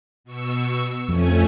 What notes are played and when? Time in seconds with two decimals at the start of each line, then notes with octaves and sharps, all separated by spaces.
0.24 B2 C#6 E6
1.09 F2 A3 C#4 G#5